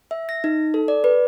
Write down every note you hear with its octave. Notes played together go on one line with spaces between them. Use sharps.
E5
A#6
D#4
A4
D5
B4